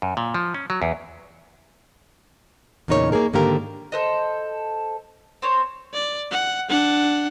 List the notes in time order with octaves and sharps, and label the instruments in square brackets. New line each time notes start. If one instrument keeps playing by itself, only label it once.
[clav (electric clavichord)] F#2
A#2
F3
C#4
F#3
E2
[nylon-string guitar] E2 A#2 C#3 D#4 A#4 C#5
A#3 D#4 G#4 A#4
G#2 D3 D#3 A#3 G4 A#4
[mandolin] A4 C5 D#5
C4 C5 C#5
[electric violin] D5
F#5
D4 F#5